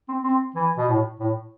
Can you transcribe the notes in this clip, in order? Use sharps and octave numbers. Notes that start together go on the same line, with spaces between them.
C4
C4
E3
B2
A2
A2